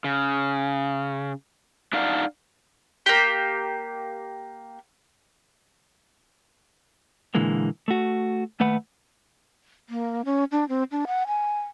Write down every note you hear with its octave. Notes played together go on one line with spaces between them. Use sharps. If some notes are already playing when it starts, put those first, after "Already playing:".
C#3
D4 D#4 D5 F5 F#5
A#3 G4
A#2 D3 E3 G#3 A#3
A3 F#4
D#2 A3 B4 F#5 B5
A#3
C#4
D4
C4
D4
F#5
G#5